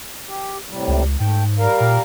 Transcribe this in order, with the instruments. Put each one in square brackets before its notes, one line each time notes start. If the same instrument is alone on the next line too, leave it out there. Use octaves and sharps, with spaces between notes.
[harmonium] G4
A2 C3 G3
[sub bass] C#2
[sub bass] G#2 [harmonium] A3 G5
[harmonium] G3 A#4 F5
[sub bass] A#2